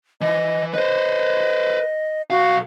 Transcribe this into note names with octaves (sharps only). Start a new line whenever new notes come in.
E3 D#5
B4 C5 D#5
B1 F#4 F5